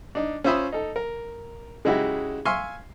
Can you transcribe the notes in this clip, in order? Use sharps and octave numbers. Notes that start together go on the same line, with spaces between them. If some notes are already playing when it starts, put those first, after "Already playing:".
D4 D#4
C#4 F4 C5 E5 B5 D#6
D#4 A4
A#4
C#3 G#3 D#4 E4 F#4 G4
E5 F5 G#5 C6 C#6 F6